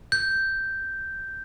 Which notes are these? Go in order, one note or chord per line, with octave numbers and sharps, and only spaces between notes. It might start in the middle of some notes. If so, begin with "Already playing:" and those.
G6